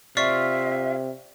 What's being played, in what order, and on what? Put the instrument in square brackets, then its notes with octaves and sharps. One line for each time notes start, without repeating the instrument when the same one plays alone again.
[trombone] C3 [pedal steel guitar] F4 F5 [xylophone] D5 C#6 B6 [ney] E5